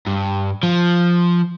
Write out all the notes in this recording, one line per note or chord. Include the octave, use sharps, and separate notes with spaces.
G2
F3